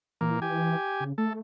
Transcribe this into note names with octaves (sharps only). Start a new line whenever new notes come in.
A#2 E3 A#3
G4 G#5
C#3
A3 A4